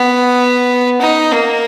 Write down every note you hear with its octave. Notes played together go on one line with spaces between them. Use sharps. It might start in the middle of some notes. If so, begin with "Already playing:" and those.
Already playing: B3
D#4
A#3